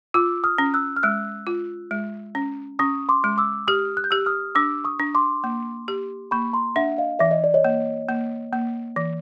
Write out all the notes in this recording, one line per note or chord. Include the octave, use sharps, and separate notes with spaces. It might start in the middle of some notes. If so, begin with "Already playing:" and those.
F4 D6 E6
D#6 F6
C#4
E6 F#6
F6
G#3 E6 F#6
F4
G#3
C#4
C#4 C#6 D#6
C6 D6
G#3
D6 E6
G4 D#6 F6
F#6
G6
G4 E6 F#6
D#6 F6
D4 D6 E6
C#6 D#6
D4
C6 D6
A#3
G4
A#3 B5 C#6
A#5 C6
D4 E5 F#5
D#5 F5
E3 E5
D#5
D5
C#5 D#5
A#3
A#3
A#3
E3